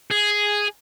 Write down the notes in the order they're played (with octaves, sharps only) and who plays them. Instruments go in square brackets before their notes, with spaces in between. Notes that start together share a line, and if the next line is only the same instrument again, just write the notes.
[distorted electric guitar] G#4